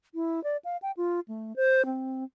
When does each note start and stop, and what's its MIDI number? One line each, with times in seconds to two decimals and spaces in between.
0.15 0.43 64
0.44 0.57 74
0.65 0.77 77
0.82 0.91 79
0.97 1.20 65
1.28 1.56 57
1.56 1.85 72
1.86 2.24 60